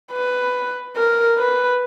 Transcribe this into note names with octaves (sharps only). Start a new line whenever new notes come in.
B4
A#4
B4